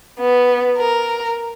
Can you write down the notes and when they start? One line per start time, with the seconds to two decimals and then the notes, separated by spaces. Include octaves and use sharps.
0.19 B3
0.77 A#4